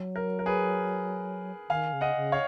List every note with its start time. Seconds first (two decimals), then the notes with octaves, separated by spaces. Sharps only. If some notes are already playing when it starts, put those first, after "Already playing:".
Already playing: F#3
0.16 A#4
0.39 A#4
0.46 G#4 B4
1.70 D#3 F5 G#5
1.93 C#3
2.01 D#5 F#5
2.16 C#3
2.32 C#5 F5